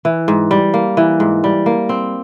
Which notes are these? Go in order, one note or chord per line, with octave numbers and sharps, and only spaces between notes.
E3
G#2
G3
A#3
E3
G#2
G3
A#3
C4